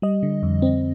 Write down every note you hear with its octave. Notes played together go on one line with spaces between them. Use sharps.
G3 D#5
D3
F2
C4